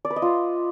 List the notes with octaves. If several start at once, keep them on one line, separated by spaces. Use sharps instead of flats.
D5
B4
D#5
F4